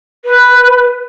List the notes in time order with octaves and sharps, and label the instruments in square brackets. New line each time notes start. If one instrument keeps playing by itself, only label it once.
[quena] B4